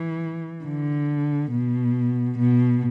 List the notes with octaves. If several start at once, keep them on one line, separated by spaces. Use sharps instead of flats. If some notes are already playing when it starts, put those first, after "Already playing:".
Already playing: E3
D3
B2
B2